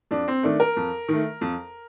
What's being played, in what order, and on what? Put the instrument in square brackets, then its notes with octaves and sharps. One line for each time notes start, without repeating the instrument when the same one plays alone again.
[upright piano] F2 D4
C4
D#3 A3 D4
A#4
F2
D#3 A3
F2